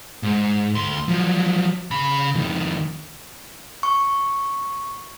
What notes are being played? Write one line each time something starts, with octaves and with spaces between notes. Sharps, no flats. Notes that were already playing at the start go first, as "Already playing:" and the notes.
G#2
D2 C6
F3 F#3
C#3 B5
F2 D#3
C#6